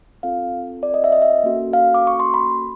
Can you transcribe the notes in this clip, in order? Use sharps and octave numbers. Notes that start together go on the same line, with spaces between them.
C4 F4 A4 F5
D5
D#5
E5
D#5
E5
A#3 C#4 F#4 A4
F5
D6
C#6
C6
B5